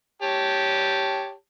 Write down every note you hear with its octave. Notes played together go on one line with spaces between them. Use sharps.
G4 C#5 A5